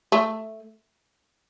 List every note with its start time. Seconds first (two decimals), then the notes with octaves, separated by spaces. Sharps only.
0.12 A3